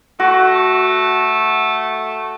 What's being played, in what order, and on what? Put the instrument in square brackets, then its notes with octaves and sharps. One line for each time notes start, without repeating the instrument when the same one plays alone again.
[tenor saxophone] A3 [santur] F#4